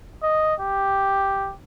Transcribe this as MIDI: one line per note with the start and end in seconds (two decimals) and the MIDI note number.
0.23 0.54 75
0.60 1.53 67